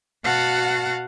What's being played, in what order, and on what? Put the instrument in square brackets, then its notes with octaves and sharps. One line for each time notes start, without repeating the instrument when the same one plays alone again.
[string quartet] B2 F#4 F5 F#5 A5 A6